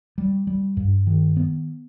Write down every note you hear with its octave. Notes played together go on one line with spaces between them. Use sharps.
G3
G3
G2
D#3
B3